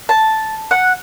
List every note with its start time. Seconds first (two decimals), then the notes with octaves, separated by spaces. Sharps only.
0.09 A5
0.71 F#5